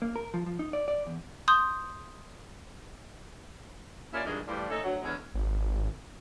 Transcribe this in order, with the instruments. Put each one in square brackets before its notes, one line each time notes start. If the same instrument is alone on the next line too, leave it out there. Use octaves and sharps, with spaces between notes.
[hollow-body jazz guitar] A#3
A#4
F3
F3
D#4
D5
D5
E2
[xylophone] C6 D#6 G6
[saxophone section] D#2 C#4 E4 F4 A#4 D5
G2 A#2 D#3 E3 G#3
A2 E3 F3 G3
A3 C#4 D#4 A4
D2 F#3
E2 B2 D3 G#3 C#4
[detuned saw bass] G#1